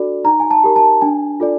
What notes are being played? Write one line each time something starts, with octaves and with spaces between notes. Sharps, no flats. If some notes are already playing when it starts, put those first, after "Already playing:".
Already playing: D4 F#4 A4 D5
D#4 A#5
G#5
A5
G4 A#4
A5
D4 G#5
F4 A4 D5